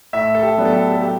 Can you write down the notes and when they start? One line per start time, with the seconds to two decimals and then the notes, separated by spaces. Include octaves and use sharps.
0.13 A2 E5
0.35 A4
0.43 G4
0.57 F#3 B3 D4
0.65 A4
0.72 G4
0.92 A4
1.01 G4